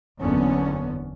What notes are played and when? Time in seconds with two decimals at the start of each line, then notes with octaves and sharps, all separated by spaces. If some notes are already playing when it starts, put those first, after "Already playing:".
0.20 F#1 E2 D3 B3 C#4